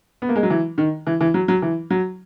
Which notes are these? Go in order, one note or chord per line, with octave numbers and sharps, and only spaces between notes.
B3
A#3
G#3
F#3
E3
D#3
E3
E3
F#3
F#3
E3
F#3